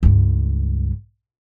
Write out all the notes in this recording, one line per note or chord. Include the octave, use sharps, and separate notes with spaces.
C#2 G2